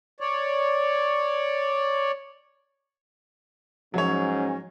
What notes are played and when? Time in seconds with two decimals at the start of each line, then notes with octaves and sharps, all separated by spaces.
0.20 C#5 D5
3.94 G#2 F3 F#3 C#4 C#5